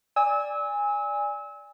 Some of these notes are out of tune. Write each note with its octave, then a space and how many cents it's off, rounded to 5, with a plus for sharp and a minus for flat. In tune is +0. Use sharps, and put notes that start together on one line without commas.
D5 +0 G#5 -20 E6 -30